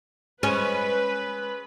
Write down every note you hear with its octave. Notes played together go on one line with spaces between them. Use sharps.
G#3 C#4 B4